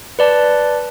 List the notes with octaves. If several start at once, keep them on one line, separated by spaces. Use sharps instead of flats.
B4 D5 A5